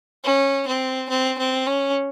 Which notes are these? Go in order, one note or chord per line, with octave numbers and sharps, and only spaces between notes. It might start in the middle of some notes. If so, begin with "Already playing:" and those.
C#4
C4
C4
C4
C#4